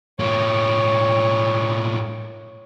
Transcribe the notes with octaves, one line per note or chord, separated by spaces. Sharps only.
A2 A#3 C#5